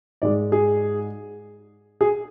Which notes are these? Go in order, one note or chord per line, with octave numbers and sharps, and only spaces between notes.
G#2 G#3 D5
G#4
G#4